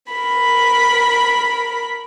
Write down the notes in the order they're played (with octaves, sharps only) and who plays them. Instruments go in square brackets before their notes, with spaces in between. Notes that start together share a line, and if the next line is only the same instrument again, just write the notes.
[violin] A#4 B5